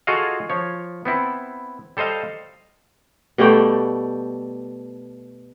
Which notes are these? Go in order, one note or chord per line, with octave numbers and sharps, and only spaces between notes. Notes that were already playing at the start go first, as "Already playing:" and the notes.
F4 F#4 G#4 A4 D#5 F5
F3 C#5
B3 C4 E4
G3 A4 C5 D#5 F5
B2 G3 A3 G5